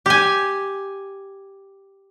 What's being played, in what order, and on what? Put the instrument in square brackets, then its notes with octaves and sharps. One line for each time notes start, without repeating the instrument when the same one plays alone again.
[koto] G4 G#5